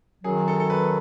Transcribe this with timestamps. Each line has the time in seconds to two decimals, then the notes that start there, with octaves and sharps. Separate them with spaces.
0.24 F#2 D#3 F#3 G#4
0.48 A4
0.60 A4
0.70 B4